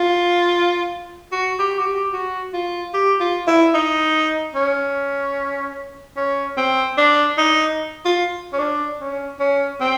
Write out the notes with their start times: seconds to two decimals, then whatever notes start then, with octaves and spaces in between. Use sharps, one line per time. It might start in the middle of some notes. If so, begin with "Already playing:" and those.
Already playing: F4
1.32 F#4
1.59 G4
1.79 F#4
1.86 G4
2.13 F#4
2.53 F4
2.94 G4
3.20 F4
3.47 E4
3.74 D#4
4.55 C#4
6.16 C#4
6.57 C4
6.97 D4
7.38 D#4
8.05 F4
8.53 C#4
8.59 D4
9.00 C#4
9.40 C#4
9.80 C4